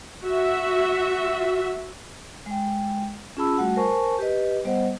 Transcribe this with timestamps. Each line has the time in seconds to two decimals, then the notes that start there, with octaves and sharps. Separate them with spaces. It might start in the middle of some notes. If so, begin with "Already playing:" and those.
0.24 F#4 E5
2.46 G#3 G5
3.37 C#4 F4 G#4 A5 B5 E6
3.58 G3 A3 F#4 F#5
3.76 A#4 C5 G#5 A5 C#6
4.19 G4 B4 D#5
4.65 G3 B3 C5 D#5 F#5